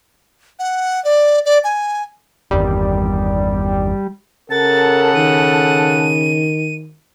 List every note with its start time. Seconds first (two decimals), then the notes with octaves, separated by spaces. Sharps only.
0.59 F#5
1.05 D5
1.45 D5
1.64 G#5
2.51 G1 E2 D#3 G3
4.50 C#3 A4 A#4 F#5 A5 A6
5.14 D#3 D#7